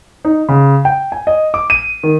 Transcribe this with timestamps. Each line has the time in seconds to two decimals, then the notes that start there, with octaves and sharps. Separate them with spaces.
0.25 D#4
0.49 C#3
0.85 G5
1.12 G#5
1.27 D#5
1.54 D6
1.70 D#7
2.03 D#3